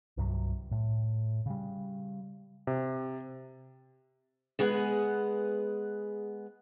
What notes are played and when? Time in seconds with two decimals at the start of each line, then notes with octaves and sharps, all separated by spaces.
0.17 C2 G2 C3 F#3
0.71 A2
1.46 C#3 G3
2.67 C3
4.59 G#3 B3 G#4 B4 F#5